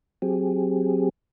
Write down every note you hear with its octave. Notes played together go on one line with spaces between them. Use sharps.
F#3 C4 G4 G#4